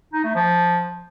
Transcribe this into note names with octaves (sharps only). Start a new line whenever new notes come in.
D#4
A3
F3